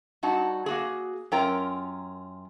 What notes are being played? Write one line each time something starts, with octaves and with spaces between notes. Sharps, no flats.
G2 D#4 F#4 A5
A#3 F#4 G#4
F#2 C#4 F4 A#4 G5 A#5